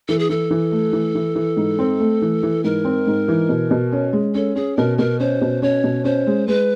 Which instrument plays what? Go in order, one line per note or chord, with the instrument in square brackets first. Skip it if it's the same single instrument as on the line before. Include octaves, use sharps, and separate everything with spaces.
[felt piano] E3 [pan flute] A4
[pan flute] G#4
[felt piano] E3 [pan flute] A4
[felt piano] E3
A3
E3
E3
E3
G#2
C4
A3
E3
E3
[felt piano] G#2 [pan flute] A#4
[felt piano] C4
G#2
E3
B2
B2
C#4
G#3
[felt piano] C#4 [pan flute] A4
[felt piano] C#4 [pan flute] G#4
[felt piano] B2 [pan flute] A#4
[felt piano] B2 [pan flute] A#4
[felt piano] C#4 [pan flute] C5
[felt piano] B2
[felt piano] C#4 [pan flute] C#5
[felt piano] B2
[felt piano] C#4 [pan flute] C5
[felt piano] G#3
[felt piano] G#3 [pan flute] B4